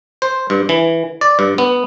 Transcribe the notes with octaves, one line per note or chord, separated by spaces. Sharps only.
C5
G2
E3
D5
G2
B3